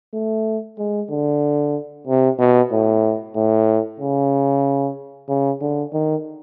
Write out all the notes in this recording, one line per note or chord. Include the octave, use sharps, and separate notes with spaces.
A3
G#3
D3
C3
B2
A2
A2
C#3
C#3
D3
D#3